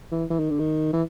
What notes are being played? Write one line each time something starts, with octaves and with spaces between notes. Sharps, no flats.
E3
E3
D#3
D3
D#3
E3